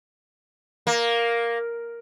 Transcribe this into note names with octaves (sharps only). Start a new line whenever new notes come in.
A#3